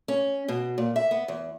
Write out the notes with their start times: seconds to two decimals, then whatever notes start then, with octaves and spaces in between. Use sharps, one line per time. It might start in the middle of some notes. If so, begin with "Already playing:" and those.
0.08 C#4
0.48 B2
0.78 A#2
0.96 E5
1.11 B3
1.28 E2